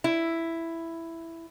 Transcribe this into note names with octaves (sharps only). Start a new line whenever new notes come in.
E4